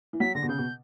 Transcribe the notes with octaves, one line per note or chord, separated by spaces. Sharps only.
E3
F#3 B6
D3 A#6
B2
C#3 G6
B2